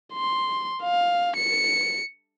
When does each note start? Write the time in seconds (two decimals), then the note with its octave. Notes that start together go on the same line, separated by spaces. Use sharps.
0.14 C6
0.84 F5
1.36 C#7